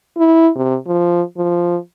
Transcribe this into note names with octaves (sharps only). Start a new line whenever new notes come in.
E4
C3
F3
F3